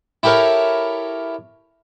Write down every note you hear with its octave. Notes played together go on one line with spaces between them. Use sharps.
E4 G4 A4 A#4 C#5